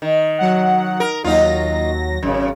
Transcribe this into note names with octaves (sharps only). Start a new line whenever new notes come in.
D#3
F#3 F#5
A#4
D#2 F#3 D#4 F4 A#6
G#1 F#2 C#3